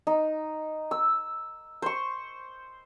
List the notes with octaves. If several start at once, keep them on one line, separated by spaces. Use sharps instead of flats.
D#4
E6
C5 C#6